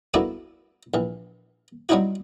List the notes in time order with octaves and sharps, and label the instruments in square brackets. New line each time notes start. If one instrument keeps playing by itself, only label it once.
[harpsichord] A#3 B3 D4 E4 F#4 A4
A#1 E3
F#3 G3 C4 D#4 E4 F#4